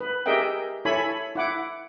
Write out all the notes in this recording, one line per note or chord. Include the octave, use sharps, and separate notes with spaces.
B4
G4 G#4 A#4 D#5 E5 G5
E4 A4 C#5 G#5 B5
E4 F#5 D6